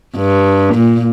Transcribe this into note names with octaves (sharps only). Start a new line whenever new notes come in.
G2
A#2